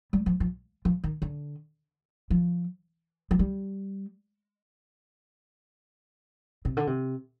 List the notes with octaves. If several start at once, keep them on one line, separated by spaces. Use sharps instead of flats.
G3
F3
F3
F3
D#3
D3
F3
F3
G3
C3
D3
C3